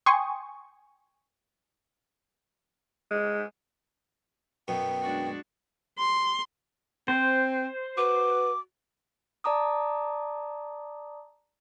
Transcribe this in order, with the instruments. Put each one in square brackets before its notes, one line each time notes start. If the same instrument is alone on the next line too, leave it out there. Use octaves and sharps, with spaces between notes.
[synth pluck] G5 G#5 C6 C#6 D#6
[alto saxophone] G#3
[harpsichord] F#2 B2 [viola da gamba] B3 [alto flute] G5
[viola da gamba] G#3 D4 F#4
[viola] C6
[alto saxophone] C4 [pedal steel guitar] C5
[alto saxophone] F#4 [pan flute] B4 [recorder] D6
[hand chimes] D5 A5 A#5 D6 D#6